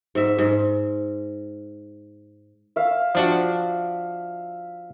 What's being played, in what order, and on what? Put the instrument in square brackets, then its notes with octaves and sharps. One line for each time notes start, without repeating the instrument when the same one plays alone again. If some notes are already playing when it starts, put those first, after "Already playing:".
[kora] G#2 E5
G#2
[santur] E5 F5
[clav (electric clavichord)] F3 D4 F#4